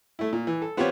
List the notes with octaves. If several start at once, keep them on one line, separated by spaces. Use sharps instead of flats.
A3 E4
A#2
E3
A4
B3 C4 F4 G4 B4 C#5